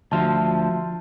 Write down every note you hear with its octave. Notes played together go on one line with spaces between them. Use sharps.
D2 F3 F#4 E5 A5